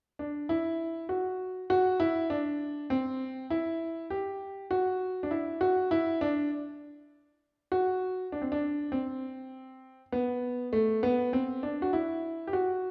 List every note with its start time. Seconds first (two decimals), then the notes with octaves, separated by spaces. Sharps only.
0.19 D4
0.49 E4
1.09 F#4
1.70 F#4
2.00 E4
2.30 D4
2.90 C4
3.50 E4
4.10 G4
4.71 F#4
5.23 D4
5.31 E4
5.61 F#4
5.91 E4
6.21 D4
7.72 F#4
8.32 D4
8.42 C4
8.52 D4
8.92 C4
10.12 B3
10.73 A3
11.03 B3
11.33 C4
11.63 D4
11.82 F#4
11.93 E4
12.47 G4
12.53 F#4